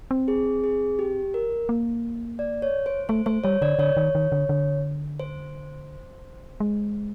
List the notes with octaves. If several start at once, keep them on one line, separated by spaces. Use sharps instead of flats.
C4
G#4
G#4
G4
A#4
A#3
D5
C#5
C5
A3 C5
A3 C5
G3 C#5
D3 D5
D3 C#5
D#3
D#3
D3
D3
C5
G#3